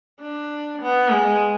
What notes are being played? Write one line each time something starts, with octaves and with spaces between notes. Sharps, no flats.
D4
B3
G#3